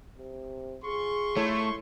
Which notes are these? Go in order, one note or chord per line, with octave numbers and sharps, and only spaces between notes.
C3
F4 G#4 C6 C#6
A3 E4 A4 C#5